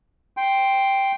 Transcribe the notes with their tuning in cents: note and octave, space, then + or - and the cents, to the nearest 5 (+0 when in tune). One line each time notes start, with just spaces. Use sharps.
G5 +0 C6 +0